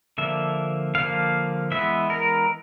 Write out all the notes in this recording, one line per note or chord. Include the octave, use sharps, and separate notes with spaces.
D3 F3 A#3 E5
D3 F3 A#3 F5
E3 G#3 B3 E5
A#4